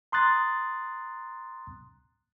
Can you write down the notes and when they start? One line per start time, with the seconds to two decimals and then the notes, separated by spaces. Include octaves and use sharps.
0.12 A#5 C6 D#6 F#6 A6